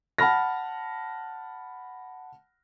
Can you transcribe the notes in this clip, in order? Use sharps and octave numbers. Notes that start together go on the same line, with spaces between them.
F#5 A5 B5 F6 A#6